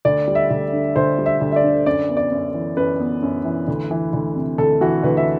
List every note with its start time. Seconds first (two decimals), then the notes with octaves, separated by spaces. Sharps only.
0.05 D2 D5
0.27 G3
0.35 E5
0.51 D2
0.73 D3
0.96 D2 C5
1.18 G3
1.26 E5
1.41 D2
1.52 E5
1.56 D5
1.64 D3
1.86 F#2 D5
2.09 B3
2.17 D5
2.32 F#2
2.54 E3
2.77 F#2 B4
3.00 B3
3.23 F#2
3.45 E3
3.68 D2
3.91 E3
4.13 D2
4.36 C3
4.58 D2 A4
4.81 E3 F#4
5.03 D2 B4
5.17 E5